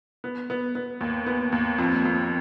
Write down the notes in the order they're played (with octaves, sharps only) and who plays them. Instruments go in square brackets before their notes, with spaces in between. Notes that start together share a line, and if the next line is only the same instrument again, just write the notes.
[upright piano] B3
B3
B3
D#2
B3
D#2
F2
F2